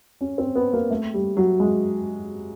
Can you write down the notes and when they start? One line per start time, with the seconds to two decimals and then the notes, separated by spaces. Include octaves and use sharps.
0.21 C#4
0.38 C4
0.55 B3
0.73 A#3
0.91 A3
1.14 G3
1.37 F#3
1.60 G#3